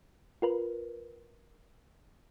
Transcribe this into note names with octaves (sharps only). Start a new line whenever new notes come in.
F4 A#4 B4